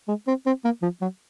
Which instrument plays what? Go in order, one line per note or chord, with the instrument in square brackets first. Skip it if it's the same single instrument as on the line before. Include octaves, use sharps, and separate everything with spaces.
[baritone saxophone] G#3
C4
C4
A#3
F3
F#3